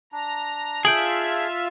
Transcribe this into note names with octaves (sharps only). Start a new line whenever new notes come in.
D4 A#5
F4 G#4 E5 G6 D7 F#7